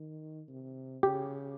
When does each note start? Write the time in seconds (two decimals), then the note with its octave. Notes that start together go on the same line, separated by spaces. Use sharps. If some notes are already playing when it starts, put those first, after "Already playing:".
Already playing: D#3
0.48 C3
1.03 C#3 G4